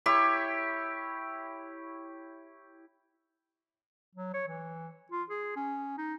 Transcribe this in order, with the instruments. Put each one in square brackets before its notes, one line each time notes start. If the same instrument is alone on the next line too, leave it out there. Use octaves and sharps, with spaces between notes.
[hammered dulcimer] E4 G4 C#5
[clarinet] F#3
C#5
E3
F4
G#4
C#4
D#4